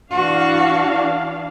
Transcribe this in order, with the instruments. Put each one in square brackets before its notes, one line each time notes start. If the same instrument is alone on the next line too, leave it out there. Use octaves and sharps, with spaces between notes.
[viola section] E3 D4 F5 [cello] F#4